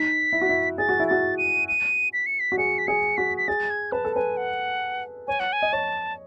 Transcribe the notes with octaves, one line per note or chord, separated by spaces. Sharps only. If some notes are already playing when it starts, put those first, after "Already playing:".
Already playing: D#4 B6
E4
F#4
E4
G#4 A6
F#4
E4
F#4 A6
D#7
D#7
B6
C#7
B6
F#4
G#4 C#7
B6
G#4 C#7
F#4 B6
B6
G#4 A6
G#6
B4 A5
A4
B4 G#5
F#5
C#5 G#5
F#5
G#5
D#5
C#5 A5